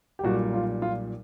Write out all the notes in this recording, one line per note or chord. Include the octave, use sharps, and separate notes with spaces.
G4
B1 A#2 G3 F#4
F4
F4